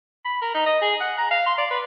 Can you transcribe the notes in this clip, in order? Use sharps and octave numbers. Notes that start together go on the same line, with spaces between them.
B5
A#4
D#4
D#5
G#4
F#5
A#5
F5
C6
D5
B4